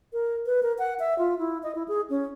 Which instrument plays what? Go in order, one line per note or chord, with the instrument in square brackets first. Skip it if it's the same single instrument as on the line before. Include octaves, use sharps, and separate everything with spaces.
[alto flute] A#4
B4
A#4
F#5
E5
F4
E4
D#5
E4
G#4
C#4